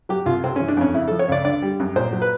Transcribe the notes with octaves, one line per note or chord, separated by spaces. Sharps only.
F#3 G4
C2 F4
C3 C4
E3 C#4
D4
F2 C#4
C#3 E4
F3 A4
C#5
C#2 D5
D3 D5
G3
F#2
A#2 C5
F#3
B4